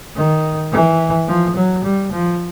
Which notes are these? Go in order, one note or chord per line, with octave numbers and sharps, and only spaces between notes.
D#3
E3
F3
F#3
G3
F3